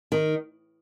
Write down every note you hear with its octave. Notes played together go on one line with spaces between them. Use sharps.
D#3